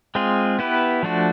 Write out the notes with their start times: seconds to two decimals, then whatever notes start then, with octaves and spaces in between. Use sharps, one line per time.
0.15 G#3 C4 F4 G#4
0.59 B3 E4 G4 B4
1.03 F3 A3 D4 F#4